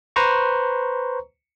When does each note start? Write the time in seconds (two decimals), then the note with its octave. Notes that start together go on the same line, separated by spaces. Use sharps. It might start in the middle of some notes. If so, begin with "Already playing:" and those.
0.16 B4 C5 A#5 C#6